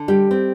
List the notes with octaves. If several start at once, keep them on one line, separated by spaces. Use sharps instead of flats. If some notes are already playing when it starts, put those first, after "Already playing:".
Already playing: D3
G3 G4
C4